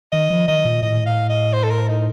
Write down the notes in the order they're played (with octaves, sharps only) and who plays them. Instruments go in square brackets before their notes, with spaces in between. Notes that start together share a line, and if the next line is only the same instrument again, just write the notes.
[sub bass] D#3 [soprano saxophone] D#5
[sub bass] F3
[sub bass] D#3 [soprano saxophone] D#5
[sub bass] A#2
[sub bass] A2 [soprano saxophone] D#5
[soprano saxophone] F5
D#5
C5
A4
A#4
D#4